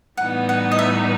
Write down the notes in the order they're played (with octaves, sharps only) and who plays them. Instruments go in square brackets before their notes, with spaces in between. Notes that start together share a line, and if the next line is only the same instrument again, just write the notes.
[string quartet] A2 E3 G3 B3 D#4 [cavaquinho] F#5
[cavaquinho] F#5
D#5
E5